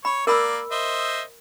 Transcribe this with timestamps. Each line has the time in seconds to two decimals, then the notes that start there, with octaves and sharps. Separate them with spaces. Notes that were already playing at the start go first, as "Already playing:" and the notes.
0.05 C#5 B5
0.27 A#3 A#4 D5 B5 E6
0.71 C5 D#5 E5